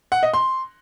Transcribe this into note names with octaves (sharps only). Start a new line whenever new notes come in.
F#5
D#5
C6